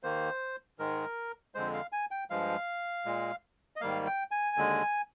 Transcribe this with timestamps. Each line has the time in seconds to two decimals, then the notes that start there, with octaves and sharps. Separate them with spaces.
0.03 D#2 D#3 A#3 C5
0.79 G#2 D#3 G#3 A#4
1.55 F2 D3 G#3 C5
1.73 F5
1.92 G#5
2.11 G5
2.30 G2 F3 G#3 F5
3.05 A#2 G#3
3.76 D#5
3.81 G#2 D#3 G3 A#3 F5
4.06 G5
4.31 G#5
4.56 D#2 D3 G#3